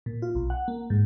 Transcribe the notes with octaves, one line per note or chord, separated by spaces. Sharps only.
A#2
F4
B1
F#5
A#3
G#2